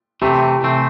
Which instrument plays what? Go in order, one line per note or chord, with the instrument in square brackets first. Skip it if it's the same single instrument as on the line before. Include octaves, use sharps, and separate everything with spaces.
[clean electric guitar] C3 E3 A3 C4 [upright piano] G4
[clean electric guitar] C3 E3 A3 C4